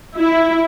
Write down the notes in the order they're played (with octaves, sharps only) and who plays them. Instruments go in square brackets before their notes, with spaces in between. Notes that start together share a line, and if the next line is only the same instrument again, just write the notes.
[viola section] E4